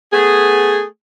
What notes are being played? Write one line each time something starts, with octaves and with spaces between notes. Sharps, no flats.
A3 B3 G#4